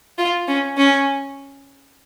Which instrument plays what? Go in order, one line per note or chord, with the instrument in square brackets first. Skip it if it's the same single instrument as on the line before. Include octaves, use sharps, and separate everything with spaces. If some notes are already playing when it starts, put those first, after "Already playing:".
[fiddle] F4
C#4
C#4